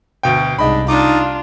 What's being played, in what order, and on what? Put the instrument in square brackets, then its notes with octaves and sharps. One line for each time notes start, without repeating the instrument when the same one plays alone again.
[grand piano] D2 B2 G5
[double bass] C2 [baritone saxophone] G#2 [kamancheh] D4 [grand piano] D#5 B5
[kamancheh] D4 F4 [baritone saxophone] D#4 [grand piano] D6